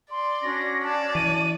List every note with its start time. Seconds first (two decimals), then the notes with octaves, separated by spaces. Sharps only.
0.11 D5 C6
0.42 C#4 D4 F#4 A#6
0.83 D5 A5
1.15 E3 D#7